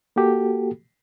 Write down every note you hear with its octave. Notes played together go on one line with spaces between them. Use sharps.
A#3 F#4 G4 A4